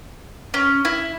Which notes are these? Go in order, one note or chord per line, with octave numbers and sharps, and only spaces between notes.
C#4
E4